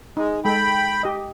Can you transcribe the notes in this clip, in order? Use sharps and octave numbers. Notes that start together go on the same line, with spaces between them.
G#3 D#4
G#3 A4 G5 B5
G4 D#5